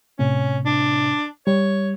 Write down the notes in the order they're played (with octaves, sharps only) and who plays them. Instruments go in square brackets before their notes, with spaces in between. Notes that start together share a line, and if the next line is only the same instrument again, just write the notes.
[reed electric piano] A2 C3 [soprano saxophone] C#4
[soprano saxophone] D4
[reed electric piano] G3 [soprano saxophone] C#5